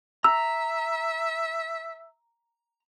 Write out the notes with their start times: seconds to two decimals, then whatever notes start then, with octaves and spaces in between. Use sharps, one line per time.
0.24 E5 A#5 E6